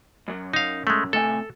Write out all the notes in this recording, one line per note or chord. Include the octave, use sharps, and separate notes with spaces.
F#2 F#3
D#4 F5
G#3 A3
A2 C3 A4 G#5